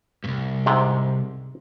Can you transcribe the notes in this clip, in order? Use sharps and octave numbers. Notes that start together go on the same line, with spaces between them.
C2 G2
G#2 C3